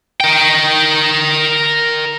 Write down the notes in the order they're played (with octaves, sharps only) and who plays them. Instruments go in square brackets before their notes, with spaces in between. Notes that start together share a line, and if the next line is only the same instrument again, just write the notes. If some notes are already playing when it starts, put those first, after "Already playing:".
[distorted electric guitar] A#4 G5